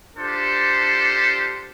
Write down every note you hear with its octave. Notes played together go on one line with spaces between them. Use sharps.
D4 F4 G4 A4 C5